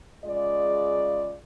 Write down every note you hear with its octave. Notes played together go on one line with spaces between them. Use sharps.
C#3 G#3 F4 D5